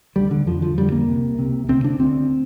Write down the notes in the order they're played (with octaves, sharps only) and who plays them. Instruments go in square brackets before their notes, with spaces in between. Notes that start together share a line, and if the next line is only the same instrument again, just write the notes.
[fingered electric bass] D2 D3 G3
D3
F2 D3 F3
F3
F2 D3 G3
A#3
C2 C3
C2 C3
D2 C3 C4
D4
D2 D3 C4